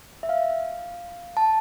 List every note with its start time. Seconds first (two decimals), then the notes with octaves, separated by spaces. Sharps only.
0.23 E5
0.29 F5
1.37 A5